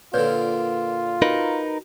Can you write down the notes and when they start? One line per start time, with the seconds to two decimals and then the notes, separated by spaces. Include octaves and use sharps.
0.14 A#2 D3 F4 B4 C#5 D5
1.22 D#4 F#4 A#4 B4